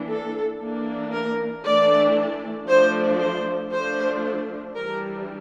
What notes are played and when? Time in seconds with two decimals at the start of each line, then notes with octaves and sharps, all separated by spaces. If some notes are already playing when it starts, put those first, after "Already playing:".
Already playing: E3 A#3 D4
0.09 A4
0.60 E3 A#3 D4
1.13 A#4
1.64 E3 A3 D4 D5
2.68 F3 A3 D4 C5
3.20 C5
3.72 F3 A3 D4 C5
4.76 E3 G3 D4 A#4